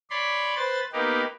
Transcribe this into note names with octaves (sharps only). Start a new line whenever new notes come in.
C#5 D5 B5 C6
B4 C5 C6 A6
A#3 B3 D#4 G4